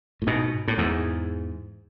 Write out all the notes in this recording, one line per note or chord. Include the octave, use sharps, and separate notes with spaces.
A2
G#2 B2
A2
E2 G#2